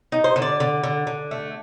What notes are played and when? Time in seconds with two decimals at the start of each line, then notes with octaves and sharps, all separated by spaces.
0.12 D#4
0.24 C5
0.36 D3
0.42 D5
0.60 D3
0.83 D3
1.07 D3
1.31 A3